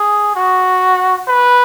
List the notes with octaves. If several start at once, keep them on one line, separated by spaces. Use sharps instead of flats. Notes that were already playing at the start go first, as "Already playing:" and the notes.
Already playing: G#4
F#4
B4